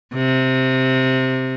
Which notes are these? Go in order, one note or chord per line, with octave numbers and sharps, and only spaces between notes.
C3